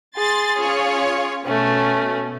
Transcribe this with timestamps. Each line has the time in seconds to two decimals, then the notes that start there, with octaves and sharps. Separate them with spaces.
0.17 G#4 C6 A6
0.60 C#4 F4 C#5
1.46 B2 A3 C#4